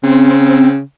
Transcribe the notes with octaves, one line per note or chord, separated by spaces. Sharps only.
C#3 C4